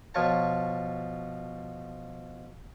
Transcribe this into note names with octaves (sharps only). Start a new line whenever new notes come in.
B2 F3 F4 C#5 A5